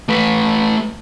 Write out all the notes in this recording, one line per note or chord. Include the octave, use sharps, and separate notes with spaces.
A3 B4